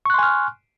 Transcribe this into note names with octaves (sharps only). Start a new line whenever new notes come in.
G#5 C6 C#6 F6 F#6